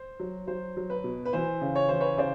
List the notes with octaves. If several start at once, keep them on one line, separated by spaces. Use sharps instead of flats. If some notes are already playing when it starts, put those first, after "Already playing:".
Already playing: C5
F#3
F#3 C5
F#3
B4
B2
B4
E3 C5
C#3
C#5
E3 C5
B4 C#5
C#3 C5 D5